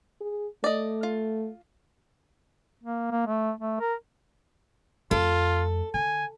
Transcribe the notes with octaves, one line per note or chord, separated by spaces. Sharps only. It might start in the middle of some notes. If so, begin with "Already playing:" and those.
G#4
A3 D5 D#5
F4
A#3
A#3
A3
A3
A#4
F2 A3 F4 A4
D3 G#5